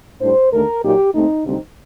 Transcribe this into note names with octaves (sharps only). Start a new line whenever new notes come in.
A2 G3 D4 C5
D#2 D3 A3 A#4
A#2 F#3 A#3 D#4 G4
D#2 D#3 A3 C4 D#4
D2 C3 G3 C4 D#4